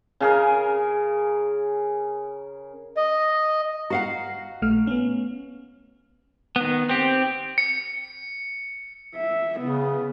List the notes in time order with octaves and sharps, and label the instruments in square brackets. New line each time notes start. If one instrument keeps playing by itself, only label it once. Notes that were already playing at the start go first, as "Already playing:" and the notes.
[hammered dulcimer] C#3 G#4 A#4
[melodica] D#5
[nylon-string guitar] F#4 F5 F#5 [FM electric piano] A#5 C7
[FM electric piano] A#1 A3 F6
B3 C#4
[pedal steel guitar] D#3 B3
C4 G4
[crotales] C#7
[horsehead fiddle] E5
[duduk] C#3 [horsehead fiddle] B3